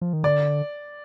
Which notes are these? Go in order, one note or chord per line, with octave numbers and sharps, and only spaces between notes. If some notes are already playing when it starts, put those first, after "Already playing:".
F3
D#3
D3 D5